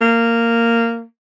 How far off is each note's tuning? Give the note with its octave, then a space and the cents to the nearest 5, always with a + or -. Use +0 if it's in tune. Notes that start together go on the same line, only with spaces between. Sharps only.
A#3 -15